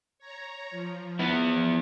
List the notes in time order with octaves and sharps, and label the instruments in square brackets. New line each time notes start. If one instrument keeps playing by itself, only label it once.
[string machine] C#5 A#5
F3
[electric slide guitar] B3 E4